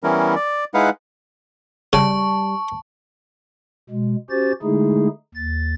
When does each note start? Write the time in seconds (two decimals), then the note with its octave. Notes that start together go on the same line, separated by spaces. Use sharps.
0.03 E3 G3 B3 C#4 E4 A#4
0.36 D5
0.74 G#3 D#4 E4 B4 F5 F#5
1.93 C#3 G3 A5 C#6
3.90 B2 G#3
4.30 C#4 F#4 G4 C5 A6
4.62 D3 G#3 A3 D#4 E4 G#4
5.35 D#2 A6